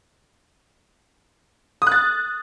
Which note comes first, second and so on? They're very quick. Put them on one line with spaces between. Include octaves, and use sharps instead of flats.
D#6 F#6 A6